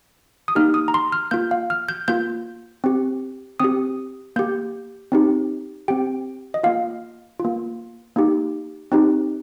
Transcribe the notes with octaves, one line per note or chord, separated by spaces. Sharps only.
D#6
A#3 D#4 G4 F6
D#6
A#5
C6
F6
A#3 F4 G6
F5
F6
G6
A#3 F4 G6
C4 G4
C4 G4 D#6
A#3 G4 G6
C4 D#4 G4
C4 G4 G5
D#5
A#3 F4 F5
F4
A#3
A#3 D#4 G4
C4 D#4 G4